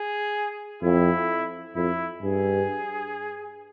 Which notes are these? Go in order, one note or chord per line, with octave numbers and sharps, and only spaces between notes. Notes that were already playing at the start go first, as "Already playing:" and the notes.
Already playing: G#4
F2 E4
F2 E4
G2 G#4